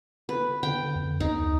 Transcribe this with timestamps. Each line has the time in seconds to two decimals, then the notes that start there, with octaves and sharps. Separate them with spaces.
0.29 B4
0.63 D3 G5
0.95 F2
1.20 D2 D#4